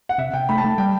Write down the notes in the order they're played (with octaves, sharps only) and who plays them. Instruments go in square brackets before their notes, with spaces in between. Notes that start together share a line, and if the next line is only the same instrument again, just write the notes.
[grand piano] F#5
[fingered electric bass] C3 [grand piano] E5
[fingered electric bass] C3 [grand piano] G5
[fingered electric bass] A3 [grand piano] B5
[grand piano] A5
[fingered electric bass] A3
[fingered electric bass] G3 [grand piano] G5